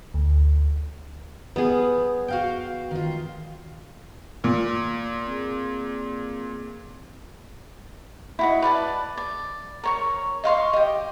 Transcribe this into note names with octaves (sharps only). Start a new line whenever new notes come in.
D2
G3 B3 G#4
F#4 F5 G5
D#3 F4
A#2
C4 G#4
E4 F#4 D#5
B4 D5 F5 A5
D5
A#4 C#5 C#6
D#5 F5 C6 C#6
G4 D#5